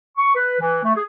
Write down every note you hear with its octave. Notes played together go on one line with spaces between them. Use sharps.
C#6
B4
E3
A3
G#4